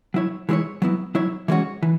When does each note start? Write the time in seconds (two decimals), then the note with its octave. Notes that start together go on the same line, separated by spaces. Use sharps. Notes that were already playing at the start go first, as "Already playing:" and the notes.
0.14 F#3 E4 C#5
0.49 E3 G#3 E4 C#5
0.82 F#3 B3 E4
1.15 F#3 E4 C#5
1.48 E3 G#3 C#4 F#4 C#5
1.83 E3